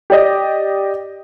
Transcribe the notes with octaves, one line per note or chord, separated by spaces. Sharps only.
G4 D5 D#5